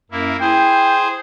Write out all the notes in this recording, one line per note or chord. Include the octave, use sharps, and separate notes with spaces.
F#2 A#3 E4
E4 G#4 C5 G5